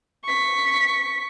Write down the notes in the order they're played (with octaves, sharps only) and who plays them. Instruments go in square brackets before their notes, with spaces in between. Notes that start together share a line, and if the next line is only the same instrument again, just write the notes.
[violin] C#6 B6